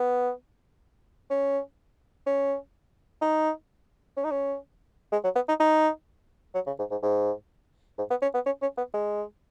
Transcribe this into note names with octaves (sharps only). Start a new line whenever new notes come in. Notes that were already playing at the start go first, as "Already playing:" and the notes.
Already playing: B3
C#4
C#4
D#4
C#4
D#4
C#4
G#3
F#3
B3
D#4
D#4
F#3
C#3
G#2
G#2
G#2
G#2
B3
C#4
B3
C#4
C#4
B3
G#3